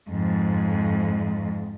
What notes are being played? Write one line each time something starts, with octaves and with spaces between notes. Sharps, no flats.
F2 G#2